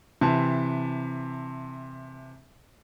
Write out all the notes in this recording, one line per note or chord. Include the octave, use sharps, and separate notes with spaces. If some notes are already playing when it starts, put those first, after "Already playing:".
C3 E3 A5